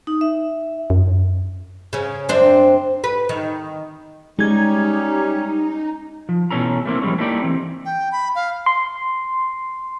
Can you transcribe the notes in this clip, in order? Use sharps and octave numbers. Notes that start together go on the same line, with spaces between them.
D#4
E5
F#2
C#3 C#4
F#2 C4 D4
B4
D#3
G3 G#3 C#4 D#4 G#6
F3
B2 E3 C#4 A4 A#5
A3 A#3 C4 E4
F3 G3 G#3 C#4
A3 A#3 D#4 E4 G4 D5
E3 C4
G5
B5
F5
C6